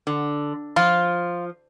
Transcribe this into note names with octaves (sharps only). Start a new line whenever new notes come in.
D3
F3 F4